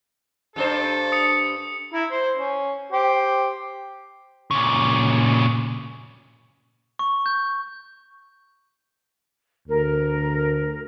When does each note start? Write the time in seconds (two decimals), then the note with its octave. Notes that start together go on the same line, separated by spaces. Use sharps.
0.56 G2 D4 A4 C5
1.12 D#6 C#7
1.93 E4 A#5
2.11 C5
2.36 C#4
2.92 G4 C5
4.51 A#2 C#3
6.99 C#6
7.26 G6
9.68 D2 A#4